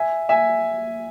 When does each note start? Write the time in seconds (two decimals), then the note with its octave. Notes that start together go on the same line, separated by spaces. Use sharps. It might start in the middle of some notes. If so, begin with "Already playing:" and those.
Already playing: E5 G#5
0.29 E5 G#5